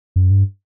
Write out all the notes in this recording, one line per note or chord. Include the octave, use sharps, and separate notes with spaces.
F#2
G2